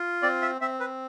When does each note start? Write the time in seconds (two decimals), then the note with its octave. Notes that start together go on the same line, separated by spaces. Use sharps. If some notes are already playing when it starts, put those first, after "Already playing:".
Already playing: F4
0.22 C4 D5
0.42 E5
0.61 C4 E5
0.80 B4